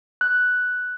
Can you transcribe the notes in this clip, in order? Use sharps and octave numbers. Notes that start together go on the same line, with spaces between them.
F#6